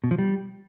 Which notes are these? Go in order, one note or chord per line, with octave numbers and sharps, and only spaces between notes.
B2
F3
G3